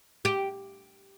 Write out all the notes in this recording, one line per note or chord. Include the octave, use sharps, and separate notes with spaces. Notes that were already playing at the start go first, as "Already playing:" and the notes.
G4